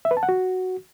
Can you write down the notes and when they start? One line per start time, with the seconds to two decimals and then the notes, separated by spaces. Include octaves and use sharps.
0.05 E5
0.11 B4
0.17 A5
0.23 F#5
0.29 F#4